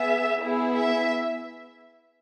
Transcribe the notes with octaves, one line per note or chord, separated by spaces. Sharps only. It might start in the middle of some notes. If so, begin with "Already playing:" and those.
Already playing: B3 G#4 E5
B3 E4 G#4
E5